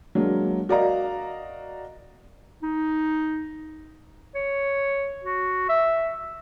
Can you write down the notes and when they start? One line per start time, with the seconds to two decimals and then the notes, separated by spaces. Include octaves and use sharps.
0.15 F#3 G#3 A#3 D4
0.69 F#4 A#4 D5 D#5 F5 A#5
2.63 D#4
4.35 C#5
5.24 F#4
5.69 E5